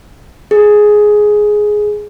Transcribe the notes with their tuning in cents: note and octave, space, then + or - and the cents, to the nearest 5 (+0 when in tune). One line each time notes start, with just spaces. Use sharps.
G#4 +10